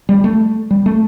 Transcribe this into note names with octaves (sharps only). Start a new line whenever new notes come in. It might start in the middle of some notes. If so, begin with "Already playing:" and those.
G3
A3
G3
A3